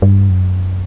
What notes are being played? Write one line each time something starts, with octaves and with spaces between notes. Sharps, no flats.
G2
F#2